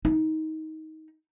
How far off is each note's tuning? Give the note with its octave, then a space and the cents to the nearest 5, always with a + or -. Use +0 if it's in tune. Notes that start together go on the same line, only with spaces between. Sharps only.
D#4 +20